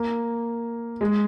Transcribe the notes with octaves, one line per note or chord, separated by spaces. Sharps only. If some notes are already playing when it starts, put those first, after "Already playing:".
Already playing: A#3
G#3